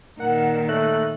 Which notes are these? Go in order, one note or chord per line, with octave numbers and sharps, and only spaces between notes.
A#2 D#3 A#4 F#5
A3 C#5 F#6